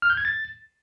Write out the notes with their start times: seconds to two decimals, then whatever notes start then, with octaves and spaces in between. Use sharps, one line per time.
0.02 F6
0.10 G6
0.17 G#6
0.25 A6